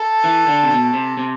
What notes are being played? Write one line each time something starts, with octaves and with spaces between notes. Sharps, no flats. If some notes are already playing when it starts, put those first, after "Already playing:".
Already playing: A4
E3
D3
C3
B2
C3
C3